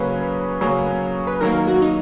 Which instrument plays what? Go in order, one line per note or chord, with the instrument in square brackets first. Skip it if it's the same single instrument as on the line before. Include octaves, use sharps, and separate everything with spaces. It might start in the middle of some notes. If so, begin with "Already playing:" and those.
Already playing: [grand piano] C#3 F#3 A#3 C#4 [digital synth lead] B4
[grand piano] C#3 F#3 A#3 C#4
[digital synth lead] B4
[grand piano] D#3 F#3 A#3 [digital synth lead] A#4
[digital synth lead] F#4
D#4